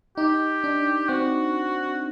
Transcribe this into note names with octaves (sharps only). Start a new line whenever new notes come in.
D#4 G4
D4
C4 F#4